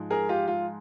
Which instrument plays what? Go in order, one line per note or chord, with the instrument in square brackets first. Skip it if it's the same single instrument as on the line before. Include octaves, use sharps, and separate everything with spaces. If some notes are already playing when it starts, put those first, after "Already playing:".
Already playing: [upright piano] G#2 F3 G#3
G#4 A#4
F4 G4
F4